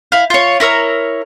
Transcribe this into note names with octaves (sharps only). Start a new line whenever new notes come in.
E4 F5
F4 C#5
E4 A#4 C#5 E6